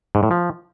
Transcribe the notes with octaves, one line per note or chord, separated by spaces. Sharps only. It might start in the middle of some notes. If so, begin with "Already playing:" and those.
G#2
A2
F3